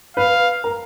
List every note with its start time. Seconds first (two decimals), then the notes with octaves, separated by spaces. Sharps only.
0.17 B4 F5
0.64 A#4